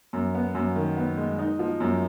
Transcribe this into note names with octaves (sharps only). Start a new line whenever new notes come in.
F#2
B3
F#2
D#3
B3
G#3
D#4
F3
F#2